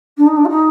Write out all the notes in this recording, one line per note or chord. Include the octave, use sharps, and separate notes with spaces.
D4
D#4
D4
F#4
D#4